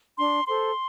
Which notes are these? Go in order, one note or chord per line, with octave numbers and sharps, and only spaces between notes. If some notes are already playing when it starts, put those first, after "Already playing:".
D4 C6
A4 C5 C6